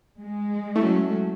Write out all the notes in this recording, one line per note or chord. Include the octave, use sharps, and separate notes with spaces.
G#3
F#3 A3 C#4 E4